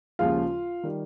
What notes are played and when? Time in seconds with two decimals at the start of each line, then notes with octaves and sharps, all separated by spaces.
0.19 D#2 C#3 F3 G#3 F4 F5
0.83 D#3 G3